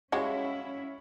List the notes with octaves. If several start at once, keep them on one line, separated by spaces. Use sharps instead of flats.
G3 G#3 C#4 E4 F#4 C#5 F5 F#5